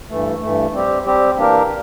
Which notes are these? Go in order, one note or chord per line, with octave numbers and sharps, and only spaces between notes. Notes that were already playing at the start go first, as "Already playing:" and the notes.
G2 E3 A3
G2 E3 A3
G3 C4 G4
G3 C4 G4
E3 A#3 D4 G4 A#4